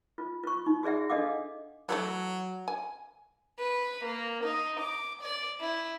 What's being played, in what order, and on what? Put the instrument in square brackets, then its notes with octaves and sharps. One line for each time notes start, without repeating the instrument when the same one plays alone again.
[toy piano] F4
F4 C#6
D#4
F#4 G#4 D5 E5 F#5
D4 A4 D#5 F5 F#5 D6
[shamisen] E3 G#3 A3 [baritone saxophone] F#3
[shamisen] G#5
[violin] B4
A#3
D#4
D6
D5
E4